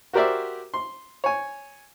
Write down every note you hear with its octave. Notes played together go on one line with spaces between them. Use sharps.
F#4 G4 A#4 C5 D5 E5
C6
C#5 G#5